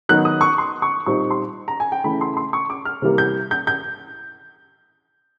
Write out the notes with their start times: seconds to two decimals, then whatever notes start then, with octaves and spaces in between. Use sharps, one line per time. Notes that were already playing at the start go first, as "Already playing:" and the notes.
0.09 D#3 F#3 B3 D#4 F#6
0.25 D#6
0.41 C#6
0.58 C6
0.82 C#6
1.06 A#2 G3 C4 D#4 C#6
1.31 C6
1.68 A#5
1.80 G#5
1.92 G5
2.04 C#3 E3 A3 B5
2.21 C6
2.37 C6
2.53 C#6
2.70 D6
2.85 F6
3.02 C3 E3 G3 A#3
3.18 G6
3.51 G6
3.67 G6